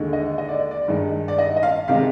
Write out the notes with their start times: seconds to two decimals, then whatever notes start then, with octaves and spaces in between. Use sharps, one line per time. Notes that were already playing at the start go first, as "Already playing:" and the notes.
Already playing: D#2 D3 G#3 D#4
0.13 D#5
0.38 D#5
0.49 D5
0.71 D5
0.88 G2 D#3 G#3 D#4
1.28 D5
1.38 D#5
1.56 D#5
1.63 F5
1.88 C3 D#3 G#3 D#4 F5